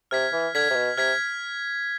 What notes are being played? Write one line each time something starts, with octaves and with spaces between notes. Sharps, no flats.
C3 F6 G#6 B6
E3
D3 F6 G#6 B6
C3
B2
C3 F6 G#6 B6